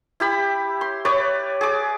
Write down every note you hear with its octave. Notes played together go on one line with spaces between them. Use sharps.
E4 G4 B5
C6
B4 C#5 D5
G#4 D6